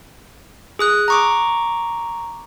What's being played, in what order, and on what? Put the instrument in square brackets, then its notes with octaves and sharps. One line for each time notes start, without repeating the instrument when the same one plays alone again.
[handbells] G#4 D#6 F#6
A#5 C#6 D6